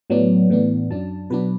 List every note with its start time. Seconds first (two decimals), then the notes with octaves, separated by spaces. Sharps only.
0.10 A2 F#3 B3 D4
0.50 A2 E3 B3 D4
0.91 F#2 F#3 D4 A5
1.30 B2 F#3 B3 D4 B4